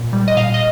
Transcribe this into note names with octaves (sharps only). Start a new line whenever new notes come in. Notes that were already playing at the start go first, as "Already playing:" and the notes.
Already playing: A#2
G3
D#5
A#2 F5
D#5